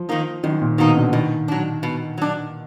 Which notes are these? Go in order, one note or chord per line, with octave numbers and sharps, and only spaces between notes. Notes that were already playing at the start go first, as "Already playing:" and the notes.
Already playing: F3
D#3 A#3 D#4
F#2 D#3
A#2
B2 D#3 A#3 D#4
D3
B2 D#3
F#3 D4
B2
F#3 D4